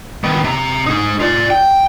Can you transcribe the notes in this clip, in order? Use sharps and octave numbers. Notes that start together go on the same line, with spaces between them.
D#3 B3
C3 A#5
D#4 G#4
F4 D5
G5